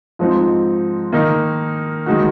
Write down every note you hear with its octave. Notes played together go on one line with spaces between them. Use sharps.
G#2 F3 C4 D#4
D#3 A#3 D#4
D#3 G#3 D#4 F#4